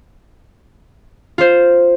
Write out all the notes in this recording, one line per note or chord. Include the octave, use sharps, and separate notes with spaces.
F4 C5